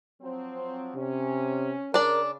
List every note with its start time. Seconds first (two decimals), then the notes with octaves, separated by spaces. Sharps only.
0.21 F3 F#3 C4
0.96 C3 C#4
1.94 C#3 D4 A#4 D5